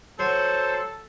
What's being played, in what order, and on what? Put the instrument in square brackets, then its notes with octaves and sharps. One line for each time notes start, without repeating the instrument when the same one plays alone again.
[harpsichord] F#3 [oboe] A4 [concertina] C5